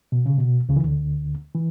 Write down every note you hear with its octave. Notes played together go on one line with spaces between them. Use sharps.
B2
C#3
B2
C#2 C#3
E3
D2 D3
E3